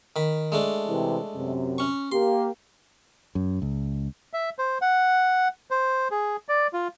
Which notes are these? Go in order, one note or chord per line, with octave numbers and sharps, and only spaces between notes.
D#3 B5
G#3 A3 D4
C3 E3
F#2 C3
C#4 C#6
A#3 G4 C6
F#2
C#2
E5
C5
F#5
C5
G#4
D5
F4